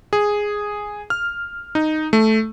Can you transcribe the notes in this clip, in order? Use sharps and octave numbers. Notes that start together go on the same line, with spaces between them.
G#4
F6
D#4
A3